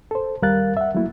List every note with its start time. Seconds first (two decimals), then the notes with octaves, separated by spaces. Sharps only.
0.11 A4 C5
0.42 D#2 G3 A#4 F5 F#6 A6
0.77 E5 F#5
0.95 F#3 A3 A#3 E4